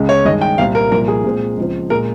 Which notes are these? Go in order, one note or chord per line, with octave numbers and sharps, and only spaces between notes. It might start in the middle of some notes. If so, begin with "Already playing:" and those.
Already playing: C#2 C#3 G#3
C#5
G2 D#3 G#3 D#5
G5
C2 A#2 G3 C4 F5
A#4
C2 A#2 F3 A#4
G#4
A#2 G#3 C4
C#2 C#3 F3 C4
A#2 G#3 A#4